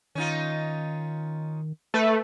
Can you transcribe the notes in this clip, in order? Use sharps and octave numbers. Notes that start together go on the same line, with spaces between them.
D#3 C#4 D#4 F4
A3 B4